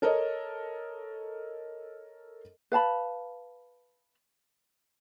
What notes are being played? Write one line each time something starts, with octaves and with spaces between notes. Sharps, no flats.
A4 A#4 C#5 D#5
B4 F5 A5 B5